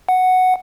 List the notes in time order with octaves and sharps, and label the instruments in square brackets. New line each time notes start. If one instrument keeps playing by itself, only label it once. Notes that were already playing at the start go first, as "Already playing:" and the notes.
[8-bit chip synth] F#5